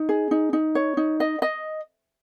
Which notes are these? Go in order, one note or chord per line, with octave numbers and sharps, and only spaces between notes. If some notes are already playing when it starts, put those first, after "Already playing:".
Already playing: D#4
G#4
D#4
D#4
C#5
D#4
D#5
D#5